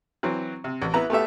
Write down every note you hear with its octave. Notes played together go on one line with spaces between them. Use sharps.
E3 F#3 C4
C3
A1
B3 E4 B4 A#5
A3 B3 G4 A4 E5